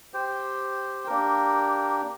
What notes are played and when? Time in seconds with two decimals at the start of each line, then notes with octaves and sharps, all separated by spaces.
0.14 G4 C5 G5
1.07 A#3 D4 G4 A#4